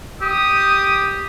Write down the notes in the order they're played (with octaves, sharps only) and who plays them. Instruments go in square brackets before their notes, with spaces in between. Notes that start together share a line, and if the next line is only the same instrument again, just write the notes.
[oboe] G4 [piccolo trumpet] D#6